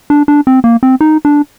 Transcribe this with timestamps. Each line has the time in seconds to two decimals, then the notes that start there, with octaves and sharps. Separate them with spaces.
0.10 D4
0.28 D4
0.47 C4
0.64 A#3
0.83 C4
1.01 D#4
1.25 D4